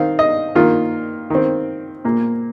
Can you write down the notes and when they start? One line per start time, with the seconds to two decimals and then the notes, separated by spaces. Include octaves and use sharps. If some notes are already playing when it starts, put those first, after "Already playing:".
Already playing: D#3 C4 F5
0.19 D#5
0.55 D#3 A#3 F4
1.30 D#3 C4
2.05 A#2 A#3